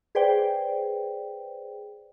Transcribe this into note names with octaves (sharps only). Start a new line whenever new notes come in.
G#4 B4 C5 D5 G5